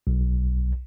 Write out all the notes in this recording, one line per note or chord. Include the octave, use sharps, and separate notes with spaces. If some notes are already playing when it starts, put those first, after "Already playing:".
B1